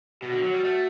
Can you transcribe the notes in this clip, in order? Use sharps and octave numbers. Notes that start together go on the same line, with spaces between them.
B2 F#4
D3
F#3
G3
A3